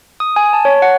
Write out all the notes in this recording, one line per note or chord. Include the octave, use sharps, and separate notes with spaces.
D#6
G#5
A5
C#5
F#5